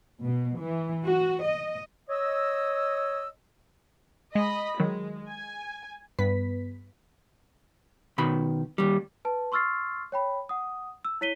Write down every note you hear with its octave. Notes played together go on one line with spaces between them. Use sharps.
B2
E3
F#4
D#5
C#5 D#5 E6
G#3 D#5 B5
D#3 F#3 G#3
G#5
G2 B3 B4 B6
B2 D#3 B5
D#2 G3
B4 A5
C6 C#6 E6 F6 A6 C7
C#5 G5 B5
F#5 D#6
E6
E4 C#5 B6 D#7 G7